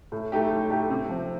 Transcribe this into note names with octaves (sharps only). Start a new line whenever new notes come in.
A2
A3 D#4 G4
A2
A3 D#4 G4
C3
F3 C4